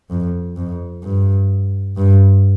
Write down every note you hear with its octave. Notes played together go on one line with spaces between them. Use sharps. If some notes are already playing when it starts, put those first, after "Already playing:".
F2
F2
G2
G2